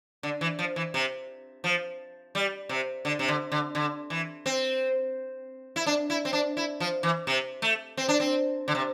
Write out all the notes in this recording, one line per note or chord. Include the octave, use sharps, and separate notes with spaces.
D3
E3
F3
E3
C3
F3
G3
C3
D3
C3
D3
D3
D3
E3
C4
E4
D4
E4
C4
D4
E4
F3
E3
C3
A3
C4
D4
C4
D3
C3